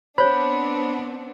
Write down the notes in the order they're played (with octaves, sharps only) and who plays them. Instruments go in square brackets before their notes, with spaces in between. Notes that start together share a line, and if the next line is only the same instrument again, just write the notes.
[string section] B3 C4 D4 [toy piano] C5 C#5 [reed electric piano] B5